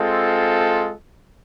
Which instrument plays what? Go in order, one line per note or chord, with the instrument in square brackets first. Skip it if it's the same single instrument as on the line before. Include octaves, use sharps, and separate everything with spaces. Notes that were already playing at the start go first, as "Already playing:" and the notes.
Already playing: [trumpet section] G#3 C4 F4 A4